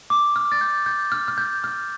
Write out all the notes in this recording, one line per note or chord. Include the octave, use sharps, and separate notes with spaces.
D6
F6
A6
G6
G6
F6
F6
G6
F6